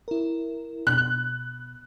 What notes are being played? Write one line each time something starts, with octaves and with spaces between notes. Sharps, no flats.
E4 A#4
B2 F#6